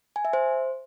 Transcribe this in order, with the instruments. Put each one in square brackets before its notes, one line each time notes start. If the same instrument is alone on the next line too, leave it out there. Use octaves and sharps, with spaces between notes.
[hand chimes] G#5
E5
C5